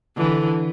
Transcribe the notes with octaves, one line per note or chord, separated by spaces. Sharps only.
D3 E3